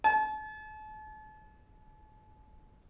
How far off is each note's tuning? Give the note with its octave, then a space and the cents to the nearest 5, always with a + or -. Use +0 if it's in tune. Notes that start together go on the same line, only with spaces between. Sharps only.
A5 -40